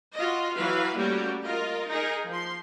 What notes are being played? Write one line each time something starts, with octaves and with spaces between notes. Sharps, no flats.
F4 F#4 D#5
E3 F#3 B4 F5
G3 A3 A#3 C#4 F#4 G4
F4 A#4 D#5
D#4 G#4 A#4
F3 C6